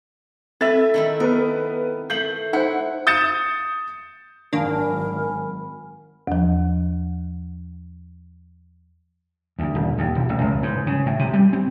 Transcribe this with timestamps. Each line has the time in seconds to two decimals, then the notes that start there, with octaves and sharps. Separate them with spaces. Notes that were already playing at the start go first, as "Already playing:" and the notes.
0.61 C4 E4 A4 B4 E5 A6
0.94 D#3 A3 E4
1.20 B3 A#4 B4
2.10 A3 G6 C7 F#7
2.53 D#4 E4 C5 F#5
3.07 D#6 G6 A6 C#7 E7
4.53 G#1 D#3 F#3 A#3 D4 A#4 G#5 B5
6.27 E2 F3
9.59 D2
9.75 D#1
9.98 D#2
10.15 E1
10.29 A1
10.41 C#2
10.63 G#2
10.87 C#3
11.06 A2
11.19 C3
11.33 G3
11.53 C4